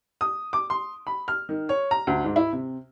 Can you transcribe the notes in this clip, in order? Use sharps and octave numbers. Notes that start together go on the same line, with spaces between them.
D#6
D6
C6
B5
F6
D#3
C#5
A#5
D2
G#2
E4
C3